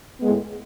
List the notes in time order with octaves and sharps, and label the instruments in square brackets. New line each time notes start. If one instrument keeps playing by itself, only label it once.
[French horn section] A2 G#3 B3